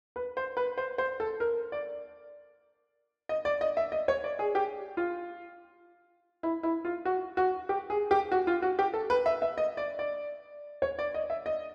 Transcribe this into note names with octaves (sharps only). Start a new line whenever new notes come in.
B4
C5
B4
C5
C5
A4
A#4
D5
D#5
D5
D#5
E5
D#5
C#5
D5
G#4
G4
F4
E4
E4
F4
F#4
F#4
G4
G#4
G4
F#4
F4
F#4
G4
A4
B4
E5
E5
D#5
D5
D5
C#5
D5
D#5
E5
D#5